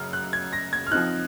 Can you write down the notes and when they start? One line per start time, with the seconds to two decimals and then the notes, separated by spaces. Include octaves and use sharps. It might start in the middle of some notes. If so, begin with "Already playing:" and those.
Already playing: F#2 C#3 F6
0.13 F#6
0.33 G#6
0.53 A#6
0.73 G#6
0.87 F6
0.91 F3 C4 D#4 F#6